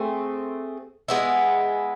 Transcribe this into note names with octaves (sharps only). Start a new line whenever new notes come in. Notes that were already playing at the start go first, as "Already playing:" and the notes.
Already playing: A3 C4 G#4
G#3 B3 E4